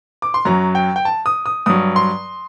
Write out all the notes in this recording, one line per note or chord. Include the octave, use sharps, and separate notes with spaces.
D6
C6
F#2 F#3 A#5
G5
G5
A5
D#6
D#6
G2 F#3 D#6
C6